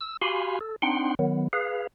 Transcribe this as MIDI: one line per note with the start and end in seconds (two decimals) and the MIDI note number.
0.01 0.17 88
0.21 0.59 66
0.21 0.59 67
0.21 0.59 77
0.21 0.59 80
0.21 0.59 83
0.21 0.59 84
0.61 0.76 69
0.82 1.15 60
0.82 1.15 62
0.82 1.15 63
0.82 1.15 78
0.82 1.15 79
0.82 1.15 84
1.19 1.48 51
1.19 1.48 54
1.19 1.48 59
1.53 1.87 68
1.53 1.87 71
1.53 1.87 77